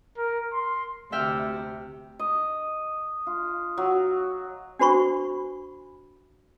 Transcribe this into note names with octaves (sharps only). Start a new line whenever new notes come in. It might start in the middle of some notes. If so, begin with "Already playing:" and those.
A#4
C6
D2 C3 E5 G5 F6
D#5
F4
F#3
D4 F#4 C5 B5 C#6